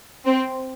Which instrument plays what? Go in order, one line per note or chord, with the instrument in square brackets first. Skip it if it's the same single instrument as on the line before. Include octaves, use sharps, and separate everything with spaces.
[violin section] C4